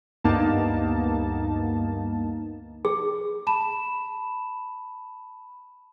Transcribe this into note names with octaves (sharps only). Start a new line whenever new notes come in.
D2 G2 A#3 B3 D#4 A5
G#4
A5 B5 E7